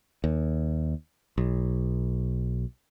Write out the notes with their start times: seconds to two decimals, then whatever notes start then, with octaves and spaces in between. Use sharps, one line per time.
0.24 D#2
1.38 B1